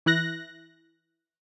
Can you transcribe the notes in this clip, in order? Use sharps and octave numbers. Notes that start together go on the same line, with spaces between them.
E3 E4 F#6 A#6